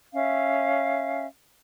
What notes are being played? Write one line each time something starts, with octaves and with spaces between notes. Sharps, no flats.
C#4 E5 F5